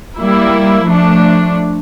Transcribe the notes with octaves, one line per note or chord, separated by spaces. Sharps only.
G3 A#3 E4
F3 A3 D4